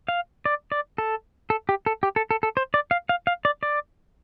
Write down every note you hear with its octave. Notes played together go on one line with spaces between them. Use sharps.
F5
D5
D5
A4
A4
G4
A4
G4
A4
A4
A4
C5
D5
F5
F5
F5
D5
D5